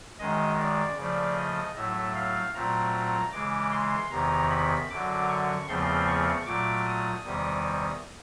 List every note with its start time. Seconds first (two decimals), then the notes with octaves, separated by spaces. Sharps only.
0.19 F#2 D#3 G#3 D#5
0.58 D5
0.97 C#3 F3 A3 D5
1.37 D#5
1.76 A2 F#3 A3 E5
2.15 F5
2.54 A#2 F#3 A3 C4 A#5
3.32 C#3 E3 G#3 D6
3.72 C6
4.11 E2 C3 D#3 A#5
4.51 B5
4.90 F#2 D3 F#3 D6
5.29 C#6
5.68 E2 C#3 F3 A3 C4 C6
6.07 C#6
6.46 A#2 F#3 A3 D6
6.86 D#6
7.25 E2 C3 D#3 G3